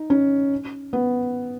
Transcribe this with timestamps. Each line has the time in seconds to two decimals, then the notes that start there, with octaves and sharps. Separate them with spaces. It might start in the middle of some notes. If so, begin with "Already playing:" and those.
Already playing: D#4
0.10 C#4
0.93 B3